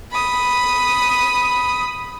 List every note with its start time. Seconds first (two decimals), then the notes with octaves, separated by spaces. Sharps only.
0.12 B5 D#6